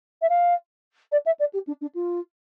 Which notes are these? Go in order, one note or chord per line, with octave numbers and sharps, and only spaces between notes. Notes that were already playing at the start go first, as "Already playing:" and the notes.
E5
F5
D5
E5
D5
G4
D4
D4
F4